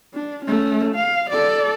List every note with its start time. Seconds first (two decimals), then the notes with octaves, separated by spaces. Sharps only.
0.14 D4
0.45 A3 C#4
0.95 F5
1.30 A4 D5